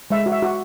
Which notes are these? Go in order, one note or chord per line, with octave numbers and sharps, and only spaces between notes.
G#3 E5
F#4
E5
F#4